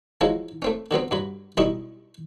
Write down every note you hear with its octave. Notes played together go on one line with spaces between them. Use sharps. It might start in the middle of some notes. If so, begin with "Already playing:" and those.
F3 F#3 G#3 C#4 E4
A3 C4 C#4
D3 F#3 B3 C4
G2 F#3 B5
B1 G3 E4 D#5 C#6 D#6